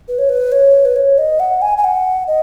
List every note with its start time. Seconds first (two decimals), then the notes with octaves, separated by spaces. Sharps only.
0.08 B4
0.18 C#5
0.29 B4
0.52 C#5
0.85 B4
0.96 C#5
1.18 D#5
1.40 F#5
1.62 G#5
1.77 G#5
1.84 F#5
2.27 D#5